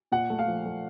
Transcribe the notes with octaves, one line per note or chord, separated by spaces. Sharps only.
A#2 F#5
A3
F5
F3
A3